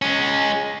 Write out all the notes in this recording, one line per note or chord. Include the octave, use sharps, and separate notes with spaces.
G#3 C#4